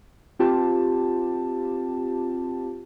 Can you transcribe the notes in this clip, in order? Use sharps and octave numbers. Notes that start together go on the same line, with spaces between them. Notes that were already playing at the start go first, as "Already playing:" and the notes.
C4 F4 G4 A5